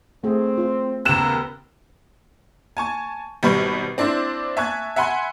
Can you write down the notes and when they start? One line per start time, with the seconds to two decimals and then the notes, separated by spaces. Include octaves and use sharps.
0.24 A3 C4 G#4
0.58 F4 C5
1.05 D#2 C#3 B3 A#4 E6 F#6 E7
2.77 G#5 A5 C#6
3.43 G#1 B2 G3 B4 B5 C#6
3.98 C4 D4 E4 C5
4.57 E5 G#5 A5 C#6 F#6 G#6
4.96 E5 F#5 G#5 B5 C6